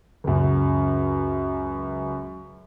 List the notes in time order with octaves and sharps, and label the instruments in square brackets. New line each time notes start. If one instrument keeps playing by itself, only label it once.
[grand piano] C#2 F#2